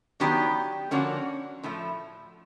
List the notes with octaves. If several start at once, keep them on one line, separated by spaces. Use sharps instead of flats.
D#3 F#3 B3 D4 G4
D3 F3 A#3 C#4 F#4
A2 F3 A3